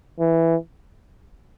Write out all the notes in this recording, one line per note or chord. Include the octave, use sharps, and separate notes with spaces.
E3